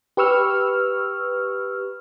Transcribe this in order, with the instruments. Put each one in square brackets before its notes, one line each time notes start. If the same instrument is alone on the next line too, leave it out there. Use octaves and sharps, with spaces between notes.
[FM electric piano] G4 B4 C#6 E6 F6